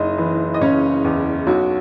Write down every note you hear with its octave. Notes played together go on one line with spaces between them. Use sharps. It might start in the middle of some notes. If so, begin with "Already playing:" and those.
Already playing: F#1 D#4 D#5
E3
D#5
C#3 C#4 C#5
E2
B1 F#4